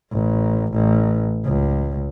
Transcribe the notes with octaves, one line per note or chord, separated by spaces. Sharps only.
A1
A1
C#2